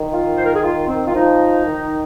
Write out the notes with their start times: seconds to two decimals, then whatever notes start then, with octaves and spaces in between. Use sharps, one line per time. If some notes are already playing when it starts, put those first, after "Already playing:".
Already playing: D#3
0.11 F4
0.36 C5
0.45 A#4
0.54 G#4
0.63 F4
0.88 C4
1.07 F4
1.15 F3 D#4
1.66 D#3